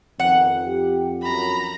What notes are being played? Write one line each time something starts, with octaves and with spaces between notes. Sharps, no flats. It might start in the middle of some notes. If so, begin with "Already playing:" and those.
F2 D#3 B3 C4 F#5
G4
F#2 A#5 B5